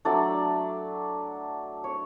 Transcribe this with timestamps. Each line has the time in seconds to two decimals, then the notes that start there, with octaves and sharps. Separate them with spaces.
0.05 F#3 A3 D4 D5
1.84 C#5